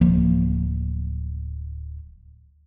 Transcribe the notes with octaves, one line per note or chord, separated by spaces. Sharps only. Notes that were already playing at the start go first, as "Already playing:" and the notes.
D1 F3 A#3